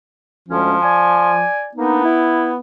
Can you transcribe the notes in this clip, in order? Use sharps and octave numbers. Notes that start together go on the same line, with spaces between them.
D2 F3 G#3 C#4
D5 G#5
A#3 B3 D4 D#4
E4